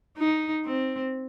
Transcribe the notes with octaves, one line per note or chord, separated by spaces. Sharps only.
D#4
C4